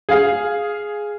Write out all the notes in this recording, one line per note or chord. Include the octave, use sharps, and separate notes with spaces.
G#4 F5